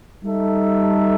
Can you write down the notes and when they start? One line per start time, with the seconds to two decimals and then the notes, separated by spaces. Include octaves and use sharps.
0.24 G3 D#4 A4 E5